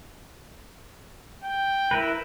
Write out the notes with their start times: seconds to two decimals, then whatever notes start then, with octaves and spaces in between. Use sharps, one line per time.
1.44 G5
1.91 E4 A#4 B4